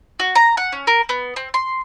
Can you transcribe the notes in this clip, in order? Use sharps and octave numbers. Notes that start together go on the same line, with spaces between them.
F#4
A#5
F#5
C#4
A#4
B3
C4
C6